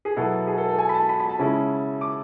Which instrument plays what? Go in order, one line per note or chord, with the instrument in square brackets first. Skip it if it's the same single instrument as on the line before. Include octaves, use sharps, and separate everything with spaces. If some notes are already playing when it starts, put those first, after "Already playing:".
[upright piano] G#4
B2 F#3 B3 E4 A4
G#4
A4
A4
G#5
B5
A5
B5
B5
A5
C#3 G#3 C#4 E4
D6